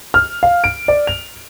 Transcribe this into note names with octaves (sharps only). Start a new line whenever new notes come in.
F6
F5
D7
D5
F7